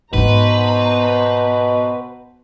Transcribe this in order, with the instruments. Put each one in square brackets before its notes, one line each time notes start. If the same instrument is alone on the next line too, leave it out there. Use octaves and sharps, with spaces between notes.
[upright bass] G#2 D#4 [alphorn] B2 [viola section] B3 C5 A#5 [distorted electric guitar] B4